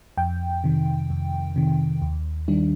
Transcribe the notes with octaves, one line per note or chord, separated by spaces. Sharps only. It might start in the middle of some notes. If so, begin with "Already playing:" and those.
F2 G5
C3 D#3
F2
C3 D#3
D#2
D#3 G3 D4